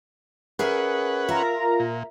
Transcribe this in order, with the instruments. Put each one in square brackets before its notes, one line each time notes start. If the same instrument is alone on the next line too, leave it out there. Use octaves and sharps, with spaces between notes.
[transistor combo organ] C#4 B4 F#5 [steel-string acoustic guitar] G#4 A#4 E5
[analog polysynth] F4 A#4 A#5 [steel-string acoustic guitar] E5
[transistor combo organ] A#2